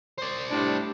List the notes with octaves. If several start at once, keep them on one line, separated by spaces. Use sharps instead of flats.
C5 D5
A2 G3 D4